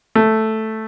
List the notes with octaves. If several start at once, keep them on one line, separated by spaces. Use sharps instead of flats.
A3